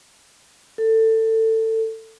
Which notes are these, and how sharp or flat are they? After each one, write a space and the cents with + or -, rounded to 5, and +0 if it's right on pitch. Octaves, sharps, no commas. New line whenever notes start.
A4 +20